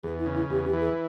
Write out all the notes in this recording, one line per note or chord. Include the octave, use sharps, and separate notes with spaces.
E2 G#4
E4
C#3
E4
E2 G4
G4
E3
G#4